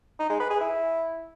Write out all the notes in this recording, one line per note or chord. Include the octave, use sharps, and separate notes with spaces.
D#4
G#3
B4
G#4
E4